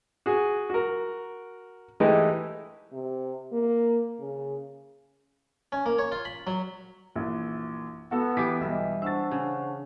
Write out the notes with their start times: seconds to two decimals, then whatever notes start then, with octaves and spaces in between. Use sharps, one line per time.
0.26 F#4 G#4
0.70 F#4 A#4
2.00 E3 G#3 A3 D#4 E4 G4
2.93 C3
3.52 A#3
4.20 C#3
5.72 C#4
5.86 A#3
5.99 C#5
6.12 F4
6.25 B5
6.47 F#3
7.16 A#1 F#2 E3
8.11 B3 F#4 A4 E6
8.37 E3 G4 D6 B6
8.61 B1 G3 D#5 E5
9.02 D4 C5 F#5 C#6 E6 A6
9.31 C#3